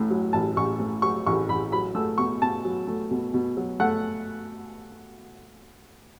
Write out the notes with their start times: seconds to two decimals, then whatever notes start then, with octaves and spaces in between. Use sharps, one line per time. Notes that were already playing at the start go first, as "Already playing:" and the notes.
Already playing: A1 A2
0.10 F#3
0.33 A1 A5
0.56 A1 C#6
0.80 A2
1.02 F#3 C#6
1.27 A1 C#6
1.48 A1 B5
1.72 F#3 B5
1.95 A3 E6
2.18 B2 C#6
2.42 B2 A5
2.65 F#3
2.87 A3
3.11 B2
3.34 B2
3.57 F#3
3.80 A3 F#5